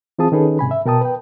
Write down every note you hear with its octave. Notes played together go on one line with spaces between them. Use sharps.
E3 C4 F4 G#4 A5 D#6
D#3 C#4 D#4 G#4 A4 B4
G#2 C3 G#5 B5
E5
B2 A#4 G5 A5 D#6
B4 G5